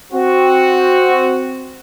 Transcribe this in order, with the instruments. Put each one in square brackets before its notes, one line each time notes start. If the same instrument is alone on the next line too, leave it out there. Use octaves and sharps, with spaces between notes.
[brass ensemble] C4 F#4